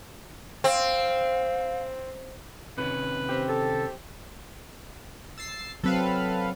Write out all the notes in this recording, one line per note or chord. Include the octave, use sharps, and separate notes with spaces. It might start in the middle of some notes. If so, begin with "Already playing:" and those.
C4 F5
C3 D#3 C#4 B4
C4 G4
A4
E6 A6 C7
F#3 C4 A4 B4 F5